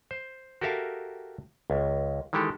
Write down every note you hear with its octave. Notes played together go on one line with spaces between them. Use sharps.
C5
F#4 G4 A4 A#4 E5 F5
C#2
D#3 E3 G#3 G4 A4